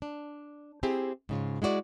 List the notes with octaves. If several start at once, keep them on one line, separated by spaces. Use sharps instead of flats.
D4
C4 E4 G4 G#4
G#2 C#3 F4
G#3 E4 F#4 D5